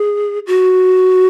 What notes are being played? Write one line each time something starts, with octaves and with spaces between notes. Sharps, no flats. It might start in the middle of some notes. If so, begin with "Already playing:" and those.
Already playing: G#4
F#4